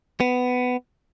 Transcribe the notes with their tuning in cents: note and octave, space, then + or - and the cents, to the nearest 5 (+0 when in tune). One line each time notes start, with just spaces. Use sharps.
B3 +15